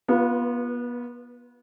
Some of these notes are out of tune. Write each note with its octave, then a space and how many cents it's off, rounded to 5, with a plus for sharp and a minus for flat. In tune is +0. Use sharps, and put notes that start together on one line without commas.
B3 -30 F4 +0 B4 +0